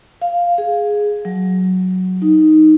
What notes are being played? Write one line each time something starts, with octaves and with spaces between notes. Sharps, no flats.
F5
G#4
F#3
D#4